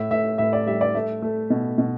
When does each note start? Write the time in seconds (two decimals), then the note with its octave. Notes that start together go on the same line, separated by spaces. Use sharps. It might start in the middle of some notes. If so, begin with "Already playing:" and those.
Already playing: A2 E5
0.11 A2 E5
0.38 A2 E5
0.53 D5
0.66 G3 E5
0.81 D5
0.95 A3 E5
1.22 A3
1.50 B2
1.78 B2